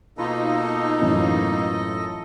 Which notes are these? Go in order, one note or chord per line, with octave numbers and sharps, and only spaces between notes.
B2 A#3 D#4 F4 A4 B4 D#5
F#2 A2 E3